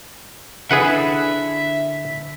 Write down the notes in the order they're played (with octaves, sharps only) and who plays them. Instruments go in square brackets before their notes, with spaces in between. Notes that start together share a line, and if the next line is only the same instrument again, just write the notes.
[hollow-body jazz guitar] D3 D4 E4 [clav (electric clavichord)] G#4 B4 F#5 [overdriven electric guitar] E5